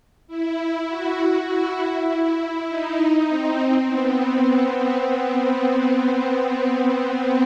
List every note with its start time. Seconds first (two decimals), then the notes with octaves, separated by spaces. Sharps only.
0.27 E4
0.88 F#4
1.47 E4
2.07 E4
2.67 D#4
3.28 C4
3.87 B3